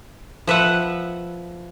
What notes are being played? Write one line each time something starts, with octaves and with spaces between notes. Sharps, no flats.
F3 B4 E5 F#5